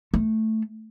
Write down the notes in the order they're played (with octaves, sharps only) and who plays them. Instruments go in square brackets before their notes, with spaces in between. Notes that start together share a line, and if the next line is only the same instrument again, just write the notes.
[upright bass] A3